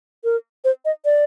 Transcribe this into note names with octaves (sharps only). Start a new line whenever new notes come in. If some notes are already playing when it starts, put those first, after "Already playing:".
A#4
C5
D#5
D5